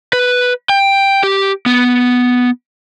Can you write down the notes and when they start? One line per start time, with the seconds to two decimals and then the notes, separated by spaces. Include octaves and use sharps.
0.13 B4
0.69 G5
1.23 G4
1.66 B3